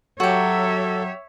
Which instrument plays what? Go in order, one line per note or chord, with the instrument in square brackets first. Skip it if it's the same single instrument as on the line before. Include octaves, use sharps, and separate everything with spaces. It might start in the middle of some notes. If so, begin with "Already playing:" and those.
[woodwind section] F#3 [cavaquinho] F#4 G4 [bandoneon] A4 [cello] C#5 E5